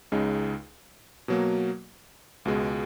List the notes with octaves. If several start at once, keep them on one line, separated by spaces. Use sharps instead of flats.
C#2 C#3 G#3 D#4
B2 F#3 A#3
C#2 B2 G#3